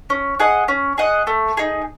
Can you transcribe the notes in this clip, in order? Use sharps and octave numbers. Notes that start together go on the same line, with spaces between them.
C#4
G#4 D#5 F#5
C#4
G#4 D#5 F#5
A3
D#4 G#4